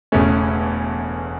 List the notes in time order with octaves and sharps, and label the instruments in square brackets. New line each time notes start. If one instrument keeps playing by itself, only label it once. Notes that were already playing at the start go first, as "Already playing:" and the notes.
[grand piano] E1 E2 C#3 A3 C#4